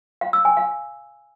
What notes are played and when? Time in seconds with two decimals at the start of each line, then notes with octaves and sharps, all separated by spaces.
0.21 F5
0.33 E6
0.45 G#5
0.57 F5